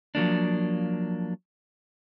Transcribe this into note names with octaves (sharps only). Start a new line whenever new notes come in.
F3 F#3 A#3 D4